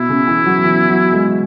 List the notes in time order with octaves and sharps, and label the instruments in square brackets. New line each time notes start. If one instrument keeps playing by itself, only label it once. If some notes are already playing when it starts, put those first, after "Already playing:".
Already playing: [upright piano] B2 [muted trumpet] E4
[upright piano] C#3
E3
F#3
E3
F#3
G#3